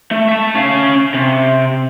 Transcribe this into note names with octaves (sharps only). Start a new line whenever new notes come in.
A3
E5 A5
C#4 F5
C3